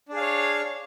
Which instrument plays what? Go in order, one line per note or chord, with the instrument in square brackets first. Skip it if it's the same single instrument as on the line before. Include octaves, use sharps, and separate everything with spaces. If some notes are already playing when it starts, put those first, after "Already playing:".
[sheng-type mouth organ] D4
G#4
F5
C#5